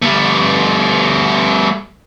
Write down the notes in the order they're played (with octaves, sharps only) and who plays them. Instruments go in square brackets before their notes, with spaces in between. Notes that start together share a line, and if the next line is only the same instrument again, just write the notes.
[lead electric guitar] G3 A3